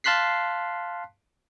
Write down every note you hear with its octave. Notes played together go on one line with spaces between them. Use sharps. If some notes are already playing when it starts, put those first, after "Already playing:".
F5 A5 C6 F#6 B6 C7